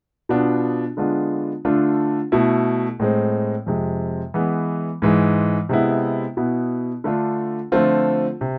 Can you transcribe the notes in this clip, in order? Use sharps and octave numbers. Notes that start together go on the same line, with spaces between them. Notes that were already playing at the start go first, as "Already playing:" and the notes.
B2 B3 D4 F4
D3 G#3 B3 D4 F4
D3 A3 D4 F4
B2 A3 E4
A2 G#3 C4
F2 C3 G#3
E3 G#3 B3
G#2 E3 G#3
C3 G#3 B3 E4
B2 B3 E4
D3 A3 D4 F4
D3 F3 A3 C4 F4
C3